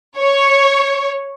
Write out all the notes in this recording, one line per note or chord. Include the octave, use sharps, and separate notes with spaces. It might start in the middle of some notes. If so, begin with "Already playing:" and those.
C#5